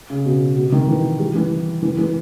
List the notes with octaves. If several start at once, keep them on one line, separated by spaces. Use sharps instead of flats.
C#3
B2
B2
D#3
E3
G3
E3
E3
E3